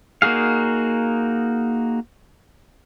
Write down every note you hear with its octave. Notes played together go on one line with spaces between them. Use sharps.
A#3 D#4 F#4 G#4 F5